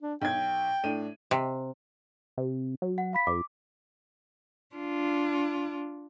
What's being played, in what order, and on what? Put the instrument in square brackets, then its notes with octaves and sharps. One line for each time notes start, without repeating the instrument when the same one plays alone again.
[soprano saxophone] D4
[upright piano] B1 G#6 [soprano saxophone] G5
[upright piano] A2 D4 D#7
[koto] C3
[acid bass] C3
F#3
[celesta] F#5
F5 B5 B6
[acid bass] F2 [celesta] D6
[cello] D4 F4